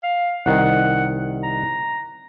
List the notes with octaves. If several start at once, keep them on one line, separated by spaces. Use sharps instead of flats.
F5
C2 D#3 F#5
A#5